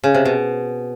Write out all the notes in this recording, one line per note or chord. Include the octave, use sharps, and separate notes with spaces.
C#3
C3
B2